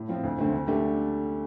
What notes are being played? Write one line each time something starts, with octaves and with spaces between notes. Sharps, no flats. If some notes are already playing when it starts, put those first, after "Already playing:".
Already playing: A2
F3 C4 F4
D2
D3 A3 C4
D2
D3 A3 D4 G4